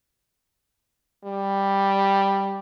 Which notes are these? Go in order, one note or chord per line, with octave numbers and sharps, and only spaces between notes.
G3